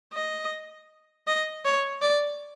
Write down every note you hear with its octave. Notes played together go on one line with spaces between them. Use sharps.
D#5
D#5
C#5
D5